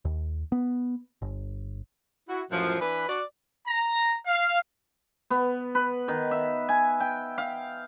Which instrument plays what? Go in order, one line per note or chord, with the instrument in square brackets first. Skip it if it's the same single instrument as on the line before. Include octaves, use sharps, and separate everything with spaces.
[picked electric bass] D#2
B3
G1
[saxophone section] E4 F#4
F#2 A2 E3 F3
E3 D4 B4
F#4 D5
[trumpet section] A#5
F5
[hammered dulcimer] B3
B4
D#3
E5
G#5
G5
F5